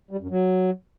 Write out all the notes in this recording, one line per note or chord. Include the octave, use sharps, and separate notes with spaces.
G3
F#2
F#3